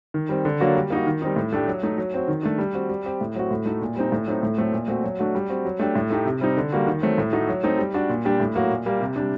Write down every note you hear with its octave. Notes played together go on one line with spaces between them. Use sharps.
D#3
G3 C4
D3
F#3 A#3 D4 F#4
G3
A#3 D#4 F#4
D#3
G3 C4 D#4
A2
A3 D4 G4
F#3
A3 D#4
F#3
C4 F#4
D#3
A3 D4
G3
C4 F#4
G3
C4 G4
A2
F#3 C4 F#4
A2
A3 D#4 F#4
A#2
G3 C4 D#4
A2
F#3 A3 C4 D#4
A2
F#3 A3 C4
A#2
A3 C4 F#4
F#3
A3 D4 F#4
G3
C4 F#4
F#3
A3 D4 G4
A2
A3 D#4 G4
C3
G3 C4 D#4
D3
G3 A#3 F#4
D#3
F#3 A3 C4
A2
A3 D#4 F#4
F#3
A3 C4 D#4
G3
D4 F#4
A#2
G3 D4 G4
A2
F#3 A#3 F#4
A#2
G3 A#3
C3
G3 D4